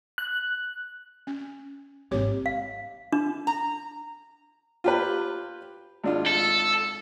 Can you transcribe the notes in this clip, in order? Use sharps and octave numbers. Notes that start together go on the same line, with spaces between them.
F#6
C#4
G#1 G#2 C4 G4 C#5
F5
D4
A#5
F4 G4 B4
G#1 D4 F4
A4